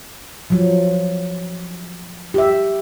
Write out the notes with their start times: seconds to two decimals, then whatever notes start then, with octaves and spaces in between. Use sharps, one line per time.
0.50 F3 F#3
2.34 G4 E5